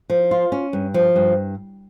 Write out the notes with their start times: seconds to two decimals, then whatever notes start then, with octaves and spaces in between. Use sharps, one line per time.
0.10 F3
0.31 F4
0.52 C#4
0.73 G2
0.94 F3
1.16 G2